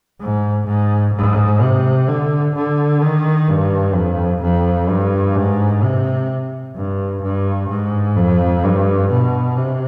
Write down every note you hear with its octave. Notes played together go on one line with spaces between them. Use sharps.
G#2
G#2
G#2
C3
D3
D3
D#3
G2
F2
F2
G2
G#2
C3
G2
G2
G#2
F2
G2
B2
C3